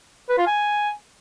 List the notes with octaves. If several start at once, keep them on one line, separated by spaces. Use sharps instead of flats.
B4
F4
G#5